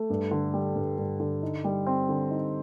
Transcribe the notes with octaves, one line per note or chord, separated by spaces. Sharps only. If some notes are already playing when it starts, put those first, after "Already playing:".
Already playing: A3
G2
D3
G3
G2
G2
D3
D#4
G3
C4
D3
D#4